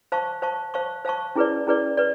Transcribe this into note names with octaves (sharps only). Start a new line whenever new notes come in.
C5 F5 A5 C#6
C5 F5 A5 C#6
C5 F5 A5 C#6
C5 F5 A5 C#6
C#4 E4 G#4 B4 D5
C#4 E4 G#4 B4 D5
B4 D5